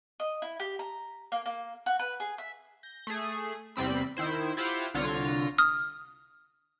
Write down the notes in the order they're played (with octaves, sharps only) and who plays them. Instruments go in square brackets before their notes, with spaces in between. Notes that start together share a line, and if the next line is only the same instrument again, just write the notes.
[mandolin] D#5
E4
G4
A#5
A#3
A#3
F#4
B4
G#4
E5
[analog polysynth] G6 A#6
A3 G#4
E2 C3 G3 C4 B5
D#3 E4 C5
E4 F4 G4 C5 F5 F#5
C2 D3 F4 C#5 A#5
[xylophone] D#6 F6